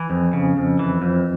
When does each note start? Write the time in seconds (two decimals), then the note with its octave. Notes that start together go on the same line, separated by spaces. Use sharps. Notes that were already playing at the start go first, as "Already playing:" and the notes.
Already playing: E3
0.10 F2
0.33 C#3
0.57 F2
0.79 E3
1.02 F2